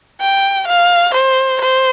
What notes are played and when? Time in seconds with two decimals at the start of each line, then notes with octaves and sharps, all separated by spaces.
0.21 G5
0.68 F5
1.15 C5
1.62 C5